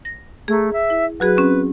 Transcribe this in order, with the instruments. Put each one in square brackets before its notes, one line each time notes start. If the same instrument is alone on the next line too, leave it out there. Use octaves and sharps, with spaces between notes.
[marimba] A#6
[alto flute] A3 [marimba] G#4 A#5
[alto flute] E5
[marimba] E4
[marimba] F#3 F#4 G#4 [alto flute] B4
[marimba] C4 C#4